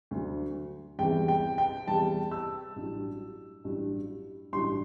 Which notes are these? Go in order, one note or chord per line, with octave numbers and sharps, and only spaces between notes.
D2 D3 F#3
E2 C3 E3 G3 G5
G5
G5
E2 C3 E3 G3 A5
E6
A1 G2 F#3
A1 G2 F#3
A1 G2 D3 F#3 C6